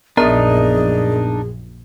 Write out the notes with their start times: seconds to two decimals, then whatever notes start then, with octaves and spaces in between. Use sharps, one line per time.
0.17 A#1 F#2 B3 D4 D#4 G#4 A#4 A#5